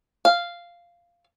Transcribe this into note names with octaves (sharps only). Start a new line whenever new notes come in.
F5